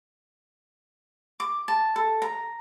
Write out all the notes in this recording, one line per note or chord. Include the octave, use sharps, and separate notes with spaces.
D6
A5
A4
A#5